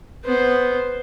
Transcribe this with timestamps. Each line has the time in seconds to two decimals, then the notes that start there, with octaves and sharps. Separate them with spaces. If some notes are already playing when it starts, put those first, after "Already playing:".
0.25 B3 C5